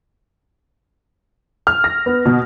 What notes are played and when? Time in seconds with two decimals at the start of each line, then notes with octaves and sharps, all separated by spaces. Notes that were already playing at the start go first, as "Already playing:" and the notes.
1.67 F6
1.84 A#6
2.06 B3
2.25 B2